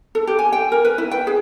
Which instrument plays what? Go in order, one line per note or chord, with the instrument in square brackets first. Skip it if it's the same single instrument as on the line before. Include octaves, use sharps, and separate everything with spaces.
[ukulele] A4
G4
G#5
G5
A#4
B4
E4
G5
G#4